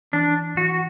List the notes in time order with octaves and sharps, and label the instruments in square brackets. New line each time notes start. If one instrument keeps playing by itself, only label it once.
[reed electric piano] E3 [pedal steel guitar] D4
[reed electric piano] E3 [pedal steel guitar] F#4